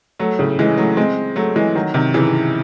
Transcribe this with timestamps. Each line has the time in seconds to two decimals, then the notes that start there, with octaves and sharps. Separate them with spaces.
0.19 F#3 A3
0.39 A2 C#3
0.59 E3 G#3
0.78 F#3 A3
0.97 G#3 C4
1.36 F#3 A3
1.56 E3 G#3
1.75 D#3 F#3
1.94 C3 D#3
2.14 C#3 E3